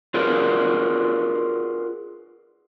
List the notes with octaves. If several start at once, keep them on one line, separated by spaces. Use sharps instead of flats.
F4 F#4 G#4 A#4 B4 D5